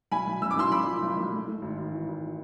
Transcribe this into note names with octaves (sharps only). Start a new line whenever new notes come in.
B1 G#5 B5
B1
B1 E6
D6
B1 C6 E6
B1 B5 D6
F3
B1
B1
A3
A3
G#1
G#1
E3
G#1